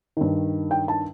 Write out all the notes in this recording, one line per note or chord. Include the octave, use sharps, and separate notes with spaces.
G2 D#3
G5
A5